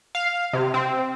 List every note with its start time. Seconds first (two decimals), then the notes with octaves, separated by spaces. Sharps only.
0.15 F5
0.53 C3
0.74 C4